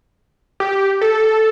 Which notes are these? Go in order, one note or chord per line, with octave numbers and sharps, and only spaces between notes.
G4
A4